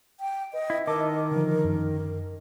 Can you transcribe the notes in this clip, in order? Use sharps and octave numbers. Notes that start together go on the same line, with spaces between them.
G5
B4 D#5
E4
D#3 A#4 D#5 A5 D6 E6
D3 F3
F#2